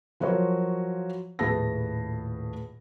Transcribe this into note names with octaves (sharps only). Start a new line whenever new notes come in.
F3 F#3 F#4 A#4 C5 C#5
D#1 A2 G#4 B4 A5 A#6